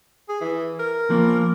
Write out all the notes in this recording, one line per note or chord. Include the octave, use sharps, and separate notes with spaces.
G#4
E3
A#4
F3 A#3